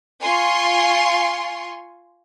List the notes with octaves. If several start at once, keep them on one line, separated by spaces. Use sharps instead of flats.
F4 G#5 C6 C#6